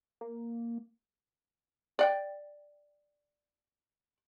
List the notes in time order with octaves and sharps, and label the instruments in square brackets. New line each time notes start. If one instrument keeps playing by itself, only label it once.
[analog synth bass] A#3
[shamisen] D5 F#5 G5